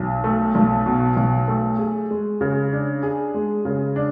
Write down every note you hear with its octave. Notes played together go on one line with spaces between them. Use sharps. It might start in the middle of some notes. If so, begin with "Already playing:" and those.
Already playing: B1
A3
B1
B2
B1
A3
G#4
G#3
C#3
D4
G#4
G#3
C#3
D4